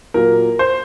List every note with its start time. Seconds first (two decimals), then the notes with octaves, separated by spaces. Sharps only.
0.14 A#2 F#3 A#3 A#4
0.59 C5